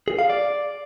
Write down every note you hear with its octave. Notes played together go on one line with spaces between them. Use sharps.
G#4
F5
D5